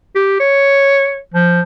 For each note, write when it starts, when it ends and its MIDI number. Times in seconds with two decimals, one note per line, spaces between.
0.15 0.38 67
0.40 1.19 73
1.34 1.61 53